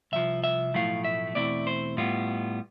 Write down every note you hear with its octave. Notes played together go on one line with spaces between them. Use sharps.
C2 C3 F3 E5
E5
B1 A2 F3 A3 E4 F5
E5
E2 B2 A3 C4 E4 D5
C5
A2 G3 B3 F4